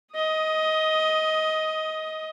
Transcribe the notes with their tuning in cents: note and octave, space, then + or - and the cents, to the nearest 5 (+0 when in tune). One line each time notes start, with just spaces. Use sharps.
D#5 +15 D#6 +0